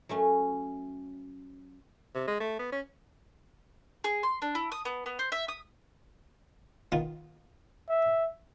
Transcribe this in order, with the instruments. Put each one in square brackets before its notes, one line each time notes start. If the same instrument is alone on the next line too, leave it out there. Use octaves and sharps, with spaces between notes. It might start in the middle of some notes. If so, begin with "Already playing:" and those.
[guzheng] F#3 A3 C#4
[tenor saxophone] C3
G#3
A3
B3
C#4
[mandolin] G#4
C6
D4
E4
D#6
B3
B3
C5
E5
D#6
[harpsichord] D#3 B3 F4
[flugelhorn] E5